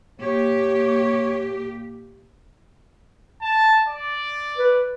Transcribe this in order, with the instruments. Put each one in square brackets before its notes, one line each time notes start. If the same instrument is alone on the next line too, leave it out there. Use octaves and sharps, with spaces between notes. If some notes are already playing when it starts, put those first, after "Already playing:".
[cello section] A#2 G4 [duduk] C#5
[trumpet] A5
D5
[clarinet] B4